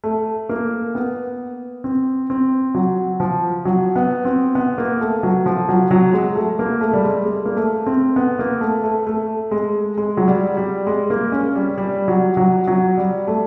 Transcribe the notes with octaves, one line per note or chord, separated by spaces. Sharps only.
A3
A#3
B3
C4
C4
F#3
F3
F#3
B3
C4
B3
A#3
A3
F#3
F3
F#3
F#3
G#3
A3
A#3
A3
G3
G#3
G#3
A#3
A3
C4
B3
A#3
A3
A3
A3
G#3
G#3
F#3
G3
G3
G#3
A#3
C#4
G3
G3
F#3
F#3
F#3
G3
A3